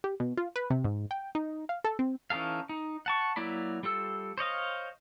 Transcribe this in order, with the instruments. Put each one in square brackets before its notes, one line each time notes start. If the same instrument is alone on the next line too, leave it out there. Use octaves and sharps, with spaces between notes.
[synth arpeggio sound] G4
B2
F4
B4
C3
G#2
G5
D#4
F5
A4
C4
[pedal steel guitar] E3 C#4 D#4 A4 F5
D#4
F#5 A5 C#6
F#3 A#3 E4 D5 B5
G3 F4 A4 E6
C5 C#5 D#5 F5